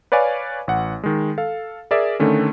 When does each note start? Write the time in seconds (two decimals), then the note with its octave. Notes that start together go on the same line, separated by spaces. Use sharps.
0.12 B4 C#5 D5 F5 G#5
0.68 A1 F#5
1.04 D#3 G#3
1.38 A4 F5
1.91 G#4 A#4 D5 E5
2.20 D3 D#3 A3 C#4